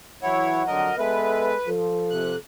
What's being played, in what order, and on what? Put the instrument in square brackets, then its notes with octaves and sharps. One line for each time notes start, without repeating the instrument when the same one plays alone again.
[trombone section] E3 F#3 [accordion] E4 C#5 [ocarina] F#5
[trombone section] F2 D3 F#3 [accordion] A#4 D#5
[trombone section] G#3 B3 A4 [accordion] B4 [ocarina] E5
[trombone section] F3 [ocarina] A4
[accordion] C3 F#6